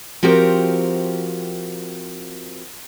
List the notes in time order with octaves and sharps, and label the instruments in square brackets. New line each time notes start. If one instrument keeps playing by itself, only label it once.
[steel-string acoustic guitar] F3 C4 F#4 G4 A#4